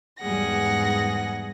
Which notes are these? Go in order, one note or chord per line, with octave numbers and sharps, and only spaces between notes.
E2 G#2 G3 G#4 F#5 A#6